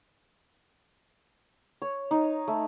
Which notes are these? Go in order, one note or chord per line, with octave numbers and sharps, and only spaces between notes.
C#5
D#4
A3